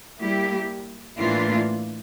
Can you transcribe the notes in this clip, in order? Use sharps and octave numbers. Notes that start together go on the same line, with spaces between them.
G3 A#3 E4 G4
A2 E3 A#3 D4 F4